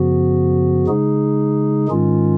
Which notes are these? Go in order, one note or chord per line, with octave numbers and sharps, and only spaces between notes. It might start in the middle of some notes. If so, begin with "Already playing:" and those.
Already playing: F#2 C#3 F3 B3 F#4
C#3 G#3 D#4 G#4
G#2 D#3 G#3 C#4 F4